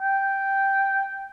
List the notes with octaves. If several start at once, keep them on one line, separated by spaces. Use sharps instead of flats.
G5